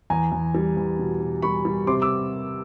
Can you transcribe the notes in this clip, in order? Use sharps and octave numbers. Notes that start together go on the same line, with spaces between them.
E2 G#5 A#5
E2
G3
E2
B2
B2
G3 B5 C#6
G3
C3 C6 D6
D6 E6